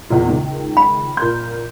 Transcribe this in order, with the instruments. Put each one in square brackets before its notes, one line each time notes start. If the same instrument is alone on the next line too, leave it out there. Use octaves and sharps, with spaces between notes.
[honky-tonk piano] E2 A#2
C#2 D#3
[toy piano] B5
[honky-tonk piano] A#2 A#4 G6 [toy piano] C6